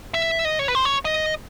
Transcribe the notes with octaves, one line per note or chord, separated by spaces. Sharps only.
E5
D#5
C#5
B4
C5
C#5
D#5